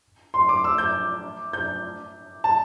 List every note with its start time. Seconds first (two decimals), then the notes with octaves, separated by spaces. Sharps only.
0.34 C6
0.49 D6
0.64 E6
0.78 G6
1.53 G6
2.44 A5